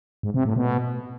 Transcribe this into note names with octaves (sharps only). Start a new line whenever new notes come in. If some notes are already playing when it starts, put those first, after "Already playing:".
G#2
C3
A2
B2